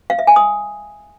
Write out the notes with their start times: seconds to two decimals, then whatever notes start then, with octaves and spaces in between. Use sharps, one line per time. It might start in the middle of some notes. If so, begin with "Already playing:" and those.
0.10 F5
0.19 E5
0.27 G#5
0.36 D#6